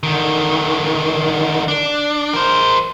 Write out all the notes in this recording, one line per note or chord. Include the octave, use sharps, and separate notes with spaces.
D3 D#3
D4
A#4 C5